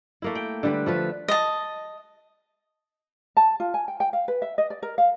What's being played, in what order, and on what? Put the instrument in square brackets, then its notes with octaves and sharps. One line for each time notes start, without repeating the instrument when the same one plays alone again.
[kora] A3 A#3 E4
G5
D3 G3 B4
F3 A3 B4
[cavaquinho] D#5 A5
[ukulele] A5
F4
G#5
G5
G5
F5
B4
E5
D#5
D5
A#4
F5